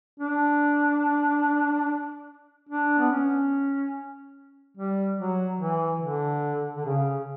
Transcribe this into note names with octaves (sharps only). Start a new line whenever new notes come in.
D4
D4
B3
C#4
G3
F#3
E3
D3
D3
C#3